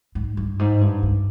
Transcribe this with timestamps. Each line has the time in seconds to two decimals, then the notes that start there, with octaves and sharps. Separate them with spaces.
0.15 G#2
0.37 G2
0.59 G#2
0.81 G2
1.03 G2